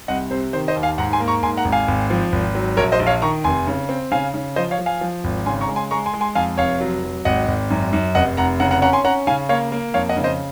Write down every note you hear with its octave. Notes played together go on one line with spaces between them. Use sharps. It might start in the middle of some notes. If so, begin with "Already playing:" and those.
C2 D#5 F#5
C3 C5
D#3 C5
C5 D#5
D#2
F5 G#5
G#2 F#5 A#5
G#5 C6
A#3
A#5 C#6
G#2 G#5 C6
F#5 A#5
G#1
F5 G#5
G#1
F3
G#1
F#3
A#1 A#4 C#5
C5 D#5
A#1
C#5 F5
D#3 A#5 C#6
F1 G#5 C6
C#3
C4
C#3 F5 G#5
C#3
F3 C5 D#5
C#5 F5
F3
F5 G#5
F3
G#1
C#3 G#5 C6
A#5 C#6
G#3
G#5 C6
G#3 A#5 C#6
G#5 C6
G#3
G#5 C6
F2 F5 G#5
F1 C#5 F5
F#3
F#3
G#1 D#5 F#5
G#1
F#2
F#2
F1 D#5 F#5
F1 F#5 A#5
C#3 F#5 A#5
F#5 A#5
C#4 F#5 A#5
G#5 C6
C#4 F#5 A#5
C#3 F5 G#5
A#3 C#5 F5
A#3
F2 C#5 F5
D#5 F#5
C#3
C5 D#5